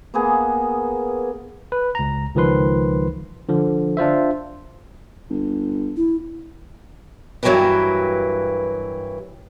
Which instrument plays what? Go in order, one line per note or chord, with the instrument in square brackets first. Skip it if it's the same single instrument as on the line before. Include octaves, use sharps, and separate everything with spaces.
[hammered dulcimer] A#3 B3 G#4
[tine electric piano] B4
C#2 A#5
C#2 D#3 F3 B4 C6
D3 F3
D4 F4 C5 E5
[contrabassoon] G1
[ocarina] E4
[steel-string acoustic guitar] G2 E3 F#3 G4 A#4 B4